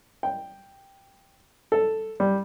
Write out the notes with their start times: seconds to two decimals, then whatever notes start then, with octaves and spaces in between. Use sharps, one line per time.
0.23 G5
1.72 A4
2.20 G3